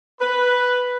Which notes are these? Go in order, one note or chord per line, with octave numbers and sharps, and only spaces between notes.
B4